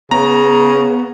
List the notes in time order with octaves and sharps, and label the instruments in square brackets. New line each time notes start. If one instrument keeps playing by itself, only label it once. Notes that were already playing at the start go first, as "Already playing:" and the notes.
[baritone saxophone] C#3 [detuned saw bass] B3 [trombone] G#4 [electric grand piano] A#5